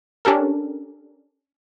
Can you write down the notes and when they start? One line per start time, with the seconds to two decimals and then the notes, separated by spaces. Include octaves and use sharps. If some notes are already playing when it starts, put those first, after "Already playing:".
0.25 C#4 D4 G4 A4 A#4